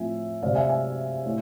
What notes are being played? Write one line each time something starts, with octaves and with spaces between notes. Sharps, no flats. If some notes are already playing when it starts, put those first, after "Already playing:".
Already playing: A2 F3 A3 C4 E5 G#5
C3 G#3 C4 D5 F5
E5 G#5
E5 G#5
A2